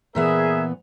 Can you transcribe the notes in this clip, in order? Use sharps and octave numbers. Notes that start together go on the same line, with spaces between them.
A#2 E3 B3 G#4 A#4 E5